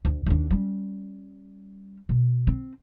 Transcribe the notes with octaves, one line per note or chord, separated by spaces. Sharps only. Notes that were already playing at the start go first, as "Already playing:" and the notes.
D2
D#2 D4
G3 C#4
B2
C4